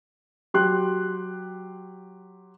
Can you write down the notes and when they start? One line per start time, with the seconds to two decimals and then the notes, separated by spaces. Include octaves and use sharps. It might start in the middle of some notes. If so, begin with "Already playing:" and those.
0.54 F#3 G4 C6 F#6